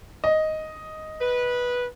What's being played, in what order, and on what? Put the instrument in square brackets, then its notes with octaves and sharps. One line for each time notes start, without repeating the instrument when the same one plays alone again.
[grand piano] D#5
[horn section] B4